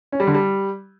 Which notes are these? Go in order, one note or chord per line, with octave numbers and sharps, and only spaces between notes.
C#4
G3
D3
G3